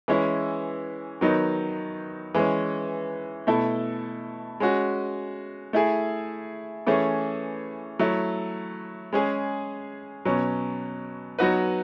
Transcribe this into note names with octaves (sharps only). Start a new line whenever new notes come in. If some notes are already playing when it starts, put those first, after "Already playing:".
E3 G#3 C#4 E4
D#3 F#3 B3 D#4
E3 G#3 C#4
B2 A3 E4 A4
G#3 C#4 F#4
A3 E4 G#4
E3 A3 C#4 G#4
F#3 A3 E4
G#3 C#4 G#4
B2 F#3 C#4
F#3 B3 D#4 F#4 B4